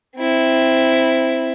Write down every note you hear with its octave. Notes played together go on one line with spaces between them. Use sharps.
C4 E4